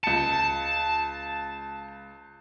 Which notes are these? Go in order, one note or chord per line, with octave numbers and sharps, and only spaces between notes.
C#2 A5 C#7